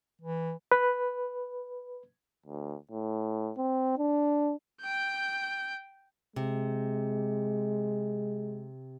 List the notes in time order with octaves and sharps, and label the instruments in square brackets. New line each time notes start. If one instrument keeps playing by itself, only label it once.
[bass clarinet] E3
[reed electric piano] B4
[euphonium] D2
A2
C4
D4
[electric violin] G5 G6
[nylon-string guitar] C3 [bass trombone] G#3